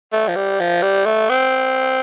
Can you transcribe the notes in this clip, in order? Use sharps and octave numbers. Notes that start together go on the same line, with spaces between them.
A3
F3
G3
F3
G3
A3
C4